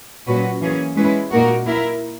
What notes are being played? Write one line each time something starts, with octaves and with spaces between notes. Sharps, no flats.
A#2 F#3 C#4 F#4 B4
E3 A#3 C#4 G#4
G#3 C#4 E4 B4
A#2 A#3 D#4 F#4 A#4
A#3 E4 A#4